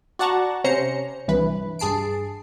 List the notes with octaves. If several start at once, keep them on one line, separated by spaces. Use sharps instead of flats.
F#4 D5 F#5 A5 A#5 C#6
C3 C#4 C5 A#5 C#7
C2 G2 E3 B4
G2 G#4 A5 C7 D7